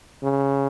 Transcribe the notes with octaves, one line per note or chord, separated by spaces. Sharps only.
C#3